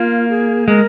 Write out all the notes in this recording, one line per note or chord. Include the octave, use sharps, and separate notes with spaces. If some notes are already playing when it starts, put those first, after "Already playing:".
Already playing: A#3 F4
G#4
G#3 A#4